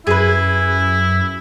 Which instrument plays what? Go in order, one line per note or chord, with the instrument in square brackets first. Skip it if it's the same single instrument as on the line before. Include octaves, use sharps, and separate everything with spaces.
[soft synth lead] F#2 [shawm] E4 [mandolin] G#4 B4